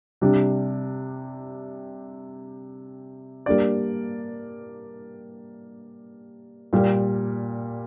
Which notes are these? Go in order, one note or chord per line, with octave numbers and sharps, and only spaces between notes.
C3 G3 D4
G3 A#3 D4 G4 D5
A#2 G3 A#3